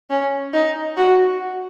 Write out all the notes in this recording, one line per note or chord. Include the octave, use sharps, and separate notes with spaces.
C#4
D#4
F#4